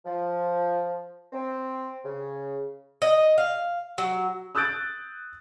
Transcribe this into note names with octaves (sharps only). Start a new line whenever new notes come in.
F3
C4
C#3
D#5
F5
F#3
D#6 E6 F#6 G6 A6 D7